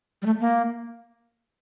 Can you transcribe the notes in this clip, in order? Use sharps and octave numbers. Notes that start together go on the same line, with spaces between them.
G3
A3
A#3